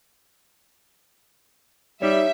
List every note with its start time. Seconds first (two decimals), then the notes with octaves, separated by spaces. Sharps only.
2.02 G3 D#4 C#5 E5